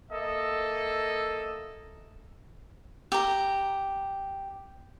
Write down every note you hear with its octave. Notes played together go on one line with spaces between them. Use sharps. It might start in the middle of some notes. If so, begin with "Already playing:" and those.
A#3 A4 D#5 E5
G4 A#5